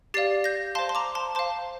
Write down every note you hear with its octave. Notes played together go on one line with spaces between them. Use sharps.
G4 D5 F5 A6 C7
G6 A#6
C5 F5 A5 C6
C6
A#5 D6
A5 C6
C5 F5 A5 C6